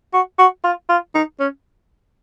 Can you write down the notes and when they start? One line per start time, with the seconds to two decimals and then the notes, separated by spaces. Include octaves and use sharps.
0.13 F#4
0.39 F#4
0.64 F4
0.89 F4
1.15 D#4
1.40 C#4